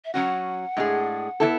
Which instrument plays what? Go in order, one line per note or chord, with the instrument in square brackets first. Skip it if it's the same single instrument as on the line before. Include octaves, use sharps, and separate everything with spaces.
[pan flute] E5
[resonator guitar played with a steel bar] F#3 C#4 F#4 [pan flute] F#5
[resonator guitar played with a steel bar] A2 G#3 D4 G#4
E3 B3 E4 A4